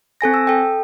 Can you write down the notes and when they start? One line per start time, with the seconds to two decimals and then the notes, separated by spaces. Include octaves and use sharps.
0.21 C4 A4 G#5 A#6
0.34 E6
0.47 A4 G5